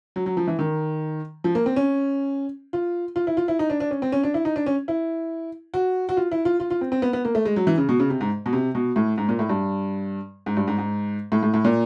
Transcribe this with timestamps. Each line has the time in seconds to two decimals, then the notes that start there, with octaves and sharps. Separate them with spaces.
0.16 F#3
0.26 F#3
0.37 F3
0.47 E3
0.59 D#3
1.44 F3
1.55 A#3
1.66 C4
1.76 C#4
2.73 F4
3.16 F4
3.27 E4
3.37 F4
3.48 E4
3.59 D#4
3.70 D4
3.80 D4
3.91 C#4
4.02 C4
4.12 C#4
4.23 D4
4.34 E4
4.45 D#4
4.56 D4
4.66 C#4
4.88 E4
5.74 F#4
6.09 F#4
6.17 F4
6.32 E4
6.45 F4
6.60 F4
6.71 F4
6.81 C4
6.92 C4
7.02 B3
7.13 B3
7.25 A#3
7.35 A3
7.45 G#3
7.56 F#3
7.67 E3
7.78 C#3
7.89 B2
8.00 C#3
8.10 C3
8.21 G#2
8.46 B2
8.53 C3
8.75 B2
8.96 A2
9.18 G#2
9.29 A#2
9.39 A2
9.49 G2
10.46 G#2
10.57 G2
10.68 G#2
10.78 G#2
11.32 A2
11.43 A2
11.54 A2
11.65 A#2